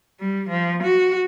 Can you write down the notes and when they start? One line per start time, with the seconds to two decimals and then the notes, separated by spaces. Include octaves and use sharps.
0.20 G3
0.49 F3
0.83 F#4